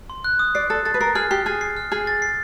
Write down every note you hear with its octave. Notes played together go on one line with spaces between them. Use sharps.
C6
F#6
D#6
D5 C7
A4 A6
A4 A6
B4
A#4 C7
G#4 F6
G4 C7
G#4 F6
C7
F6
G#4 F6
A6
C7